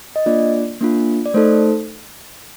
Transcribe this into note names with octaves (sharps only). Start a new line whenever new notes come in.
D#5
A#3 D4 F4 D5
A#3 D4 F4
D5
A3 D#4 A4 C5